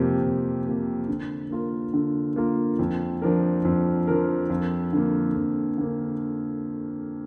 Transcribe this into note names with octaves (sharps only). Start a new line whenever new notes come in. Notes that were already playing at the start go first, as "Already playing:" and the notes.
Already playing: F2 C3 A#3 G4
F2
C3 A#3 G4
D3
A#3 F4 A#4
D3
A#3 F4 A#4
F2
F3 D4 A#4
F2
F3 D4 A#4
F2
D3 A#3
F2
D3 A#3